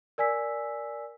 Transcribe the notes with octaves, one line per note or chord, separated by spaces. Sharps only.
A#4 D5 G#5 E6 B6